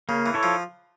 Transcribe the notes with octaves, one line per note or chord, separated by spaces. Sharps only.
C#3 A#3
E3
E4 A4 C#5
F3